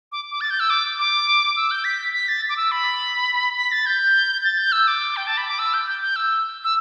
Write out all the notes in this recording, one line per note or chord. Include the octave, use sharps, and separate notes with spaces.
D6
D6
A6
G6
E6
D6
D6
E6
G6
B6
B6
A6
D6
E6
B5
B6
A6
G6
A6
G6
E6
D6
G5
A5
B5
D6
E6
G6
G6
G6
E6
E6